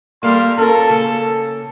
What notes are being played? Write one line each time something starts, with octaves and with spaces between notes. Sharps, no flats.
G3 A#3 A4 A#4 F5 C6
C#4 F4 A4 A#4
C#3 A#3